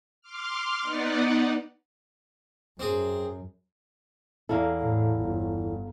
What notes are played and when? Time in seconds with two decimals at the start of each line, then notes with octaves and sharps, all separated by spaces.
0.21 C6 D6 F6
0.82 B3 D#4 D5 F#5
2.80 F#2 C4 G#4
4.49 E2 E4 A4 F5 A#5
4.80 A2
5.21 G1